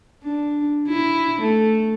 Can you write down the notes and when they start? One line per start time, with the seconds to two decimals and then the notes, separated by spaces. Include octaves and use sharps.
0.23 D4
0.89 E4
1.41 A3